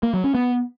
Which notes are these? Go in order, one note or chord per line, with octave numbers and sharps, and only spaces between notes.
A#3
F#3
C#4
B3